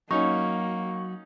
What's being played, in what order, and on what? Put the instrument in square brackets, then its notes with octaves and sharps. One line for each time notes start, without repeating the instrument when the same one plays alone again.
[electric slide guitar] F#3 F#4 [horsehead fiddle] A#3 [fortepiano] C#4 D#4 [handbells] C#6